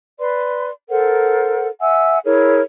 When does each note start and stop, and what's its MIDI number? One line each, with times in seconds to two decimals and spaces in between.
0.20 0.70 71
0.20 0.70 74
0.20 0.70 84
0.89 1.68 69
0.89 1.68 70
0.89 1.68 72
0.89 1.68 78
1.81 2.18 76
1.81 2.18 78
1.81 2.18 80
1.81 2.18 88
2.24 2.61 64
2.24 2.61 68
2.24 2.61 70
2.24 2.61 73